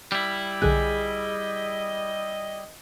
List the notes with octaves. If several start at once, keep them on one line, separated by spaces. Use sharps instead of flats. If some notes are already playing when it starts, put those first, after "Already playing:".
G3 E4
B1 D3 G#4 D#5 F#6